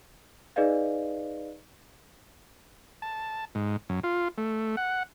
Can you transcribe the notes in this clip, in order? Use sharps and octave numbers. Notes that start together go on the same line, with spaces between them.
D#4 G#4 B4 D5 D#5 F5
A5
G#2
F#2
F4
A3
F#5